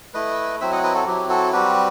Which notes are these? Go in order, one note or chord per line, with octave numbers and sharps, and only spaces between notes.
A3 E4 B4 D#5
F#3 C4 E4 C5 E5
D#5 F#5
B4 D#5
F#4 A4
F#3 C4 E4 G4
F#4 A4
G3 C4 F#4 G4 B4